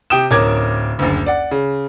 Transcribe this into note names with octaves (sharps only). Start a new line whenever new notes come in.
C3 G4 G5 D#6 E7
D1 C#4 A#4 D6 G#6
F#1 D2
D5 F#5
C#3